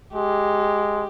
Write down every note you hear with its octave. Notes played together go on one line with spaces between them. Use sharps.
G#3 G4